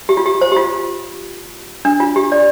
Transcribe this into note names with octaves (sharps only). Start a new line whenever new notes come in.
G4
F4
G4
C5
G4
F4
D4
F4
G4
D5